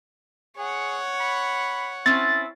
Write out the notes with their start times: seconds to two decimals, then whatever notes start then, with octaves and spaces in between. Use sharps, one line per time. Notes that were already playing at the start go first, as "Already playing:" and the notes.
0.57 G#4 C#5 F#5
1.20 B5
2.06 C4 C#4 E4 A6